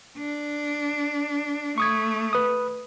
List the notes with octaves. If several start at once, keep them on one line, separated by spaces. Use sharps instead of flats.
D4
A3 C#6 D#6 G#6
B4 D#6